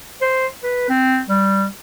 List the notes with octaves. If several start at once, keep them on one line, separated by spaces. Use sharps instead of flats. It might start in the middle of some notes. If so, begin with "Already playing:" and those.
C5
B4
C4
G3